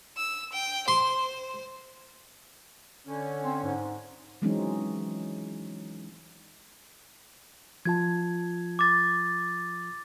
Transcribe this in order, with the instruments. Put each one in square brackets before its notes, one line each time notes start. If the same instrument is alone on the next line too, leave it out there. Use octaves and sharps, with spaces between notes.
[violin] E6
G5
[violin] C5 [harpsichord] C6
[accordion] D3 C#4
[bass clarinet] C4
G#2
[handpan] E3 F#3 G#3 C4 C#4 D#4
[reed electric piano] F3 F4 A5 [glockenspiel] G#6
[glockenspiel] D6 A6